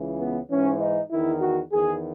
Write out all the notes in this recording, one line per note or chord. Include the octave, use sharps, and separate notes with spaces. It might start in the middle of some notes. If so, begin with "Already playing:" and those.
Already playing: C#2 C#3 E3
B3
G#2 E3 C#4
D#4
E2 D#3 E4
F#4
E2 D#3 G#4